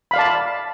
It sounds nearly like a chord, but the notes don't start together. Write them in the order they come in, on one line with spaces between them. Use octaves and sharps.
B5 F5 D5 A5